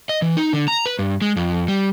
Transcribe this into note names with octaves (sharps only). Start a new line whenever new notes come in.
D#5
E3
D#4
D3
A#5
B4
G2
G#3
F2
G3